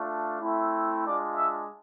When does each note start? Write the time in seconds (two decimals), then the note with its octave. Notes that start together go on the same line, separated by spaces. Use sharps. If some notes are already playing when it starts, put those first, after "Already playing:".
Already playing: A3 D4 F4
0.41 A3 C4 E4
1.06 G#3 D4 F4 D5
1.37 E5